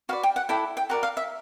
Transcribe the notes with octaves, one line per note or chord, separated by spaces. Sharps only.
F#4 B4 D5 F5
G5
F#5
E4 A4 D5 G5
G5
F#4 A#4 D5 F#5
F5
E5